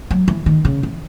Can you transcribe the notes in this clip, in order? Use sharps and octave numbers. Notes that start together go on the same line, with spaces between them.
F#3
E3
D#3
C#3
E3